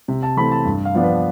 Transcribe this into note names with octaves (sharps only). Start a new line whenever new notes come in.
C3
A5
E3 A3 C4 B5
A5
G2
F5
F3 B3 D4
B4